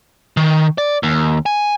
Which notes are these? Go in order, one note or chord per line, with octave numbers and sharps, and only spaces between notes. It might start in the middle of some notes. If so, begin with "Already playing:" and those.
D#3
D5
D#2
G#5